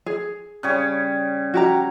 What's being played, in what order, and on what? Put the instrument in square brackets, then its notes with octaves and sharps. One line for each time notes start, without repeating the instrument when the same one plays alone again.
[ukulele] G#4
[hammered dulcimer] C#3 G3 C#5
[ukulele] F#4 G4 A#5